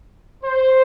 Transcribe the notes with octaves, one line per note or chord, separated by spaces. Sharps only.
C5